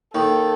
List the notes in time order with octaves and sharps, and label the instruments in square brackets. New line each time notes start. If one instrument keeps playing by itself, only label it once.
[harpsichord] D#2 D#3 [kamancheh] A4